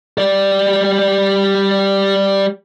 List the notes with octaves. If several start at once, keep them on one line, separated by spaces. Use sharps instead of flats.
G3 D5